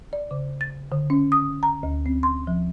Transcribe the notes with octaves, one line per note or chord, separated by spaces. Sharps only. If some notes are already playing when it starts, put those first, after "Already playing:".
D5
C#3
A6
D3
C#4
D#6
A#5
D2
C4
C6
F3